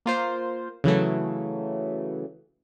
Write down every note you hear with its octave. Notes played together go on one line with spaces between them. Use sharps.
A#3 F4 C5
C#3 E3 F#3 A3